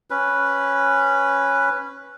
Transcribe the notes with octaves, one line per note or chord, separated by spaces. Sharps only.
C#4 B4